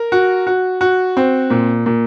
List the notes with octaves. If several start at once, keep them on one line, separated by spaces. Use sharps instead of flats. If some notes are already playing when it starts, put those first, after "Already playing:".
Already playing: A#4
F#4
F#4
F#4
C4
A#2
A#2